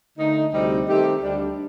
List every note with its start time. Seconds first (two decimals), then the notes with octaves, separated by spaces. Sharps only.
0.18 D3 A3 D#4
0.53 D2 C3 G3 C4 D#4
0.87 D#3 A3 C4 G4
1.22 D2 D3 G3 D4